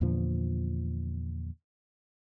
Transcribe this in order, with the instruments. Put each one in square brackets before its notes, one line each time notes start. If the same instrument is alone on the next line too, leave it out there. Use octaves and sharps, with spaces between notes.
[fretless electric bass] E2 A#2 D3 F3